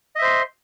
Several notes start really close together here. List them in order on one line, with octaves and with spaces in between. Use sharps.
D#5 E5 C5 C6